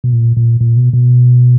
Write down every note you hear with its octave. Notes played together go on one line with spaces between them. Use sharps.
B2
A#2
A#2
A#2
B2
B2